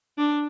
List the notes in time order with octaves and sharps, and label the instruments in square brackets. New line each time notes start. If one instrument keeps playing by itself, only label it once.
[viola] D4